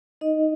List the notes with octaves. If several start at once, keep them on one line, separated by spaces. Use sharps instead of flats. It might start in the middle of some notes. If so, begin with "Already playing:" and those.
D#4 D#5